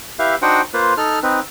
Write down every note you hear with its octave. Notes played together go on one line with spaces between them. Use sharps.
E4 G4 B4 E5 F5
D4 D#4 F#4 C5 F#5 G5
A#3 F4 B4 C5
D#4 A4 F6
C4 D#4 B4